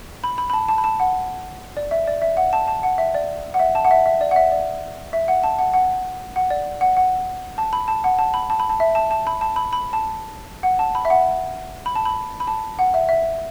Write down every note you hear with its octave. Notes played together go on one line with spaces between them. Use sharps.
B5
B5
B5
A5
A5
B5
A5
F#5
D5
E5
D5
E5
F#5
A5
A5
F#5
E5
D5
F#5
E5
A5
F#5
E5
E5
D5
F#5
E5
D5
E5
F#5
A5
F#5
F#5
F#5
D5
F#5
F#5
A5
B5
A5
F#5
A5
B5
A5
B5
A5
E5
A5
A5
B5
A5
B5
B5
A5
F#5
A5
B5
E5
F#5
B5
A5
B5
B5
A5
F#5
E5
E5